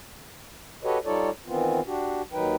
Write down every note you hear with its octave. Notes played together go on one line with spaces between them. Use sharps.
F#4 G4 A4 B4 C#5 D#5
G3 D#4 F4 A4 C#5 D5
D#3 E3 B3 C4 F4
D4 F#4 G4
D#2 D#3 F#3 D#4 B4 G5